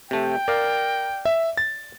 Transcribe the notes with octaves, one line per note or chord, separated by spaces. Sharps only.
C3 A3 G5
A#4 D5 F5
E5
A6